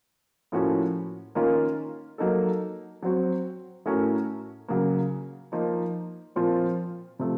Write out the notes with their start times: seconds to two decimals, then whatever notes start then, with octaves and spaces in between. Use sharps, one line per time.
0.52 A2 F3 A#3 C#4 F#4
1.35 D#3 A#3 C#4 F4 A#4
2.18 F#3 A#3 D#4 A4
3.03 F#3 C4 F#4
3.86 A2 A3 C#4 F#4 A#4
4.68 C#3 F#3 A#3
5.52 F3 A#3 D#4
6.36 A#2 F3 C4 F4
7.19 C3 F3 A3